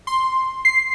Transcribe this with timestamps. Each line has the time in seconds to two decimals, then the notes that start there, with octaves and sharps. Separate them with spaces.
0.07 C6
0.65 C7